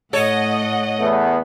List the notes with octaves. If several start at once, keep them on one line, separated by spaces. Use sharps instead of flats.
A2 A4 C#5 D#5 F#5
E2 A3 B3